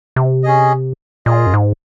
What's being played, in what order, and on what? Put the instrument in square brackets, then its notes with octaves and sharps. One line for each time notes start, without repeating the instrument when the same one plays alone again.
[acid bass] C3
[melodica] C#4 G#4 D#5
[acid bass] A#2 [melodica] F4 G#4 D#5
[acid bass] F#2
G#2